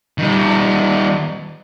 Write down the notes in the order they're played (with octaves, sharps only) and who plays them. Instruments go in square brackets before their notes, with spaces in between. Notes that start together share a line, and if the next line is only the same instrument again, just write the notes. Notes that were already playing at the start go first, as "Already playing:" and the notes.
[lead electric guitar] D#3 G3